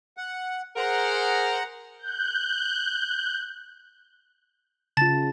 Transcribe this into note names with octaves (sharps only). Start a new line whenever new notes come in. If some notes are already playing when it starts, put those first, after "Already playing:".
F#5
G#4 A#4 C5 F#5 A#5
F#6 G6
C#3 F4 A5 A6